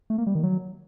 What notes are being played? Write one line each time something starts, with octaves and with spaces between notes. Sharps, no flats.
A3
A#3
G3
D#3
F#3